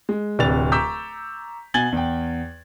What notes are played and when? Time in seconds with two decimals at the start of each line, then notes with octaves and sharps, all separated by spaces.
0.09 G#3
0.39 D1 C3 D4 B4 A6 F7
0.72 A#5 C#6 D6 E6 G6 B6
1.74 B2 G#5 G#6 A6 F#7 G7
1.92 E2 G5